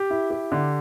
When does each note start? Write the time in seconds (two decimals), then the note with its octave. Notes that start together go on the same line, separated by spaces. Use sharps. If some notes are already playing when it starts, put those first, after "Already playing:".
Already playing: G4
0.10 E4
0.31 G4
0.52 D3